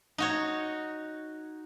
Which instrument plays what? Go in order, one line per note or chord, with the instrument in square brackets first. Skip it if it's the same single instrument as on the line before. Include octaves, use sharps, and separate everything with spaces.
[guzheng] D#4 F#4 C#5